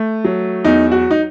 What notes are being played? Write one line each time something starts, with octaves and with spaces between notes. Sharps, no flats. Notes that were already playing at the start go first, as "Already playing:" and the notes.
Already playing: A3
F#3
E2 D#4
F#4
D#4